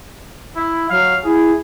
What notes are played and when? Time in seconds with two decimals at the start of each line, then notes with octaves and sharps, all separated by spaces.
0.56 E4
0.90 F#3 F5
1.24 E4 G#4